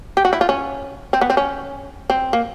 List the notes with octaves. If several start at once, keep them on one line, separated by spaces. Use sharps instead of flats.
G4
F#4
E4
F4
C#4
C4
B3
C4
C#4
C4
A#3